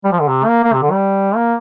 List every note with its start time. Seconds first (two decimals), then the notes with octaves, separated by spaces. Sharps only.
0.04 G3
0.12 F3
0.20 D3
0.28 C3
0.46 A#3
0.64 A#3
0.73 C3
0.82 D3
0.91 G3
1.36 A#3